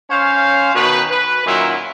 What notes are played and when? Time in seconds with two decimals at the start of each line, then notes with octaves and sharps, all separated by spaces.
0.10 C#4 C5 C#5 F5
0.75 B2 D#3 F#4 B4
1.11 B4
1.46 F#2 A#2 D#3 F#3 E4